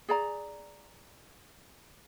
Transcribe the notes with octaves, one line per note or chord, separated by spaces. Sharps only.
G#4 D5 A#5